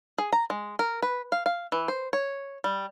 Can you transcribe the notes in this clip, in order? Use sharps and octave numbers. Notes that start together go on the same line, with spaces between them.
G#4
A#5
G#3
A#4
B4
F5
F5
E3
C5
C#5
G3